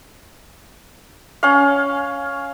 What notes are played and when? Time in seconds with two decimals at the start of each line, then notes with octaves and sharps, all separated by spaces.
1.43 C#4 F5